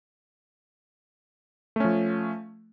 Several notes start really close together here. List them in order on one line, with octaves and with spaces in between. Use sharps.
A3 C#4 F3